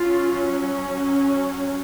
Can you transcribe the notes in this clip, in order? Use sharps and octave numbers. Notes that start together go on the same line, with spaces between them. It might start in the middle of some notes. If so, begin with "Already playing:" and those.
Already playing: F#3 C#4 F4